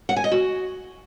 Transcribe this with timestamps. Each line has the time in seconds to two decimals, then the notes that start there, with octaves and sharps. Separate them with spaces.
0.09 F#5
0.16 G#5
0.24 D#5
0.32 F#4